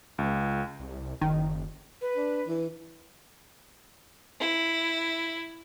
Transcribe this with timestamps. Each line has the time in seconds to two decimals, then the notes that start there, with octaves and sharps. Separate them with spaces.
0.18 C#2
0.80 C2
1.21 F#1 D#3
2.01 B4
2.16 D4
2.47 E3
4.40 E4